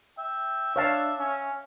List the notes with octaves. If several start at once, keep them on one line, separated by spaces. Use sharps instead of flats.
E5 G5
D4 C#5 F5 A5
C#4